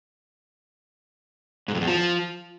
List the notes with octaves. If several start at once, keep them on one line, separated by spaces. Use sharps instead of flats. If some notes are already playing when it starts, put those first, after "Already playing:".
G#2
F2
E2
F3